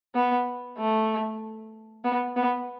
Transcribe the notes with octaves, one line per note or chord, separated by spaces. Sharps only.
B3
A3
B3
B3